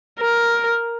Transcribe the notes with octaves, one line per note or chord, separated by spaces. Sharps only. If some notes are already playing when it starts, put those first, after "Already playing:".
A#4